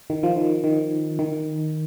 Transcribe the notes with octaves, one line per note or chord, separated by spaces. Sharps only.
D#3
F3
D#3
D#3
D#3